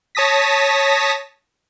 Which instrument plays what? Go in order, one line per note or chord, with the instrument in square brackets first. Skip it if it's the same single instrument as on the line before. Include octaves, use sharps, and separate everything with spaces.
[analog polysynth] C#5 A5 D#6 A#6 B6